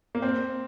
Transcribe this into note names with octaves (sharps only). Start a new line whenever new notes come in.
A#3
C4